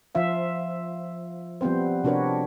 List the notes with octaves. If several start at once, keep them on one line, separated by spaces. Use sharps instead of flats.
F3 F4 E5 F5
F3 G3 B3 C4 C5
C3 D4 F#4 A#4 B4 C#5